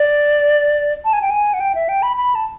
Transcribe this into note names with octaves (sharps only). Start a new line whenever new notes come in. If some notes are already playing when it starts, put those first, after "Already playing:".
Already playing: D5
A5
G#5
G5
G#5
F#5
G5
E5
G5
B5
B5
A5